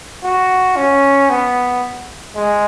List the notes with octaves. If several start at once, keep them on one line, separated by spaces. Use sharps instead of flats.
F#4
C#4
B3
G#3